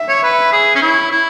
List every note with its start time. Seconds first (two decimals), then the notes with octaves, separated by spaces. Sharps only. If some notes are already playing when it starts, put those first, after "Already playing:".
Already playing: E5
0.09 C#5
0.23 B4
0.52 G#4
0.75 C#4
0.81 E4 C#5
1.11 E4